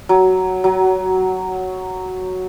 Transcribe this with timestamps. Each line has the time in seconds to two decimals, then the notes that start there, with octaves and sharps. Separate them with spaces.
0.09 F#3
0.64 F#3